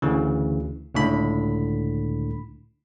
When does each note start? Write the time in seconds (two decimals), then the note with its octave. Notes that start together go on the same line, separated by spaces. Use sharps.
0.02 D2 C#3 E3
0.95 C#2 A2 D3 B5